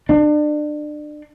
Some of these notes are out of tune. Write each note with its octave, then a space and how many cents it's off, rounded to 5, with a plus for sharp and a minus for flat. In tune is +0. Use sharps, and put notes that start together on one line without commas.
D4 +30